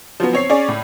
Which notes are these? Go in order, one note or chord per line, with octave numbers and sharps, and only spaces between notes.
F3 F#3 B3
C4 C#5 C7
C#4 G#4 C#5 D5
A2